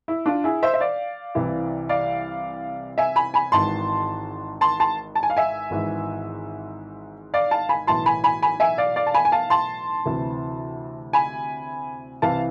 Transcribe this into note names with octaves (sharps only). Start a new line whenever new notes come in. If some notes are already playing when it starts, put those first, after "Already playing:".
E4
D4 F4
E4 G#4
C5 E5
E5
D5 F5
C2 C3 E3
D5 F5
E5 G#5
G#5 B5
G#5 B5
G#1 G#2 E3 A5 C6
A5 C6
A5 C6
A5
G#5
F5
E5 G#5
G#1 G#2 E3
D5 F5
F5 A5
G#5 B5
B1 A2 E3 A5 C6
G#5 B5
G#5 B5
G#5 B5
E5 G#5
D5 F5
D5 F5
A5
G#5 B5
G#5
F5 A5
A5 C6
D2 C3 E3
G#5 B5
C2 C3 E3 F5 A5